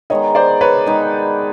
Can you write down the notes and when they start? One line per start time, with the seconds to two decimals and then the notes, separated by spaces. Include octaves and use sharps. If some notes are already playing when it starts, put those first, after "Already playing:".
0.10 D#3 G#3 B3 D#4 C#5 D#5
0.35 C5 D5
0.61 B4 C#5
0.86 D#3 G#3 B3 D#4